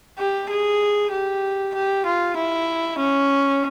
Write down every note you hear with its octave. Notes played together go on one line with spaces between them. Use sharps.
G4
G#4
G4
G4
F4
E4
C#4